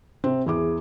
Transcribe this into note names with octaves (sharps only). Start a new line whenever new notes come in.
C3 C4
E2 E4 G#4 D6